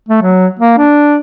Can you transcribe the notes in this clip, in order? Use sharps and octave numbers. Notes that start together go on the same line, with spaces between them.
A3
F#3
A#3
D4